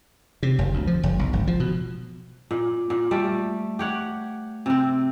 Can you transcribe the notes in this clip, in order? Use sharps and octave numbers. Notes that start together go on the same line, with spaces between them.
C3
F#1
D2
F3
F#1
B1
G#1
F3
B2
A#2
A#2
G3 A3
G4 C#5 F#5
C3 C4